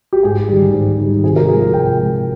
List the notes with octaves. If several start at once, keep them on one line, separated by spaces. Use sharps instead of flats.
G4
G#2 G#4
D#3 G3
G#2
D#3 G3
C3 G#4
A#4
F3 G#3 G#4
C3 G5
F3 G#3